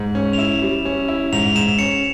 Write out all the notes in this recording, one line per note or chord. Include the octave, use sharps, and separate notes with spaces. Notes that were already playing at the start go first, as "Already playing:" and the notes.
Already playing: G#2
C#4
F7
E4 E7
G3
C#4
E4
G#2 F7
F7
G#2 E7
C#4 C#7